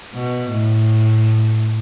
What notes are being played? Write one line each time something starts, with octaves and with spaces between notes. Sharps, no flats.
B2
A2